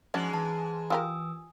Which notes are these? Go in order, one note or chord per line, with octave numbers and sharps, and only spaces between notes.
G#2 F3 G#3 C#4 D4 F#4
E3 A5
F4 G4 A#4 G#5 D#6 E6